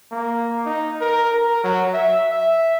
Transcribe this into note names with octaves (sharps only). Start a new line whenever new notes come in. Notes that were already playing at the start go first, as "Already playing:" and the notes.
A#3
D#4
A#4
A#4
F#3
E5
E5